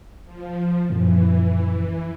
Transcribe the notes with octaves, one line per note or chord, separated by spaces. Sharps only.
F3
F#2 A#2 E3 F3